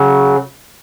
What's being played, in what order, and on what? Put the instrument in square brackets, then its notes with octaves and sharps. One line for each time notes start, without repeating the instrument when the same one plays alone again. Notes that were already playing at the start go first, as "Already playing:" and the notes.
Already playing: [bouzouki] C#3 F#3